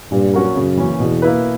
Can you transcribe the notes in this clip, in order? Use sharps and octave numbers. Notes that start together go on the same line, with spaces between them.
G2 A#2
F#3 C#4 F#4 A#4
F#2 C#3
E3 A#3 C#4
E2 B2
A#3 E4 B4